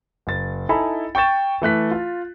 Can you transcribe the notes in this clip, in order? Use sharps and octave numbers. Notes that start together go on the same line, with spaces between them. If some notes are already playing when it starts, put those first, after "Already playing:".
F#1 A6
D#4 E4 A4 G#5 A#5 B5
G5 C#6 G6 A6 E7
E3 A3 F#6 B6
F4